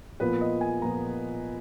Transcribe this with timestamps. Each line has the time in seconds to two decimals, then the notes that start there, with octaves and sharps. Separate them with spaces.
0.20 A#2 F3 B3 B4
0.41 D#5
0.61 G#5
0.82 A#2 F3 B3 A#5